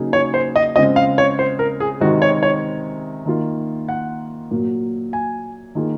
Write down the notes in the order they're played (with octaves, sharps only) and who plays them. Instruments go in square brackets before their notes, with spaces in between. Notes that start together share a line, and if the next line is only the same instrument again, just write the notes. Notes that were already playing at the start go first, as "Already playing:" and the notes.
Already playing: [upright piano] C#3 F#3 A#3 D#4 G#4
[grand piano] C#5
C5
D#5
[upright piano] C#3 G#3 C4 F4 [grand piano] D#5
[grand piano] F5
C#5
C5
A#4
G#4
[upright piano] C3 D#3 G#3 C4 [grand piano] F#4
[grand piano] C#5
C#5
[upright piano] D#3 A#3 F4
[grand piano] F#5
[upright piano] A#2 F#3 A#3
[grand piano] G#5
[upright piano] D#3 A#3 F4 G#4